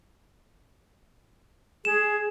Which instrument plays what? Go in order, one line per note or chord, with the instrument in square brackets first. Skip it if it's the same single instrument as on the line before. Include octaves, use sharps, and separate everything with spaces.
[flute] G#4 [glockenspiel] E7